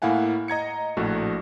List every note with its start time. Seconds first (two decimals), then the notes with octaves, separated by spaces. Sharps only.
0.02 A2 A#3 E4 F5 F#5 G#5
0.48 D#5 A#5 G#6 C#7
0.97 A#1 A2 A3 F#4